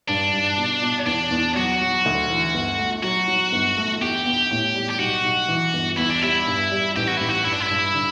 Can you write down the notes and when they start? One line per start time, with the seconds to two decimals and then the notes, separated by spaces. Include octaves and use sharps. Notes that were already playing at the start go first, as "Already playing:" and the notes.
0.08 G2 D4
0.33 G2
0.57 B2
0.82 B2
1.06 E2 D4
1.31 E2
1.56 F#3 F#4
1.81 F#3
2.05 D2
2.30 E3
2.54 G1
2.78 A3
3.03 F#3 F#4
3.28 F#3
3.52 G1
3.77 A3
4.01 E2 G4
4.26 B3
4.51 A2
4.75 G3
4.90 G4
4.99 B1 F#4
5.24 B1
5.48 E3
5.74 G1
5.98 E2 E4
6.10 D4
6.22 G3 E4
6.47 G2
6.72 G3
6.96 A1 G4
7.08 F#4
7.18 A1 E4
7.29 F#4
7.45 G2 E4
7.53 D4
7.60 E4
7.70 G2
7.94 D3